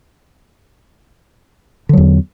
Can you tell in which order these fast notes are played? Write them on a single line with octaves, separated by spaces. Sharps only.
D3 F#3 E2